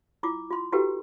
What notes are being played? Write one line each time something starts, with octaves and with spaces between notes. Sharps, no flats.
E4 F4 D6
F4 C6
E4 F#4 G4 A4 B4 G5